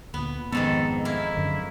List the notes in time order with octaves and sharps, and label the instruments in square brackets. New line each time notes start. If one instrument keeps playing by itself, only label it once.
[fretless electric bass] D2 A#2 [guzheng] B3
[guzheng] F2 G#2 D#3 [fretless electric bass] B3 [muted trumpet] A4
[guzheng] A#3 [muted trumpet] E4
[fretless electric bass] F#2 D3